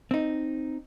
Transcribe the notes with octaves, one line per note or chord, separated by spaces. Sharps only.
C4 D#4